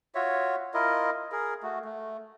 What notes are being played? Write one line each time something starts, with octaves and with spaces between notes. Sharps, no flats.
F4 F#4 C#5 E5
E4 F4 A#4 D#5
G#4 A#4
A3 F#4
A3